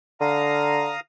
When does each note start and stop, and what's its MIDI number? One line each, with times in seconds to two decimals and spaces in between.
0.21 0.93 50
0.21 1.00 77
0.21 1.00 82
0.21 1.00 87